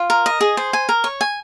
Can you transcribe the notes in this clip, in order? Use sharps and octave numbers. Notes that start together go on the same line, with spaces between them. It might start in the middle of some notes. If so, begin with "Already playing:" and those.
Already playing: F4
A#4
D#5
G#4
C5
G#5
A#4
C#5
G#5